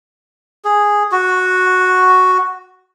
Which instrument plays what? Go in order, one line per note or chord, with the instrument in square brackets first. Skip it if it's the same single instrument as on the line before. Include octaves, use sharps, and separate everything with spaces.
[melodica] G#4
F#4